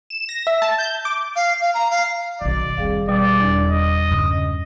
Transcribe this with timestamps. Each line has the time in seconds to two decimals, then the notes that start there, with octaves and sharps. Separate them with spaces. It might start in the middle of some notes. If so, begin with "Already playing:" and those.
0.10 E7
0.29 A#6
0.47 E5
0.62 A5
0.78 G6
1.05 D6
1.36 F5
1.62 F5
1.74 A#5
1.91 F5
2.41 E1 B1 D#3 D5
2.78 F1 G3 C4 G#4 F5
3.09 B2 G3 D5 E6
3.40 E2 D4
3.69 D#5
4.11 G2 C#3